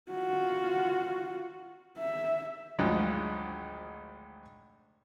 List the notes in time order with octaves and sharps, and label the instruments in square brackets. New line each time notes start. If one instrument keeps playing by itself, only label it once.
[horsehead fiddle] F4 F#4
E5
[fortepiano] G#1 D2 D3 F3 F#3 G#3